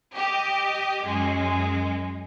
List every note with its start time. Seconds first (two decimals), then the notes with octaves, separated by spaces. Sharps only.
0.15 G4 D#5
1.04 F#2 G#3